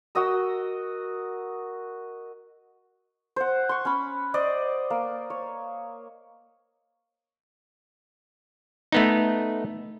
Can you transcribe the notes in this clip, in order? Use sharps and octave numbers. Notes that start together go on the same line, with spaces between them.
F#4 A#4 D#5 E6
C5 F#5
C6 C#6
C#4 B5
C5 D5 D#5
A#3
C#5
A3 B3 D#4